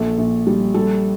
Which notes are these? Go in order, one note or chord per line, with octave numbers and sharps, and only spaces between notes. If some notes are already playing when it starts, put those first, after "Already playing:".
Already playing: A#1 A4
A#1
G3
G3 A4